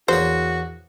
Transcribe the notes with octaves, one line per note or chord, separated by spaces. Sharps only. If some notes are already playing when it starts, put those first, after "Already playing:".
E2 A#3 F#4 C5 C#5